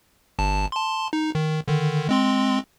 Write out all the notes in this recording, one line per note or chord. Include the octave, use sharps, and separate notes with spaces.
G1 A5
A5 C6
D#4
D#3
D3 D#3
G#3 C4 C6